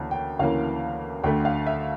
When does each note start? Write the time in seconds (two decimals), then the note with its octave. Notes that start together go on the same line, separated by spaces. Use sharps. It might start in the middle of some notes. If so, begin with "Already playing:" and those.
Already playing: D2 C#3 E3 A#3 A5
0.11 G5
0.39 D2 C#3 E3 A#3 F5
1.23 D2 D3 A3 G5
1.45 F5
1.67 E5